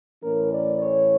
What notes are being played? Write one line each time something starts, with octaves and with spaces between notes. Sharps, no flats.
A2 E3 A3 C#4 A#4
D5
C#5